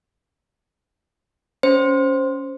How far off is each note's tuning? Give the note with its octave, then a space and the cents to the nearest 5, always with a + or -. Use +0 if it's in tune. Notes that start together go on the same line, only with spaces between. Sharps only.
C#4 +10 C5 +0